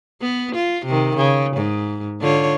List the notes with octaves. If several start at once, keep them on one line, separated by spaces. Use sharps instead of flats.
B3
F4
C3 D#3
C#3
G#2
D3 F4 C#5